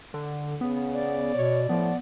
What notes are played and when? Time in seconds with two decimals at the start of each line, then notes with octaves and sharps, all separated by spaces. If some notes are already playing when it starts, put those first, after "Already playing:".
0.14 D3
0.61 C#3 B3
0.94 D5
1.35 B2 C#5
1.69 A2 F3 B3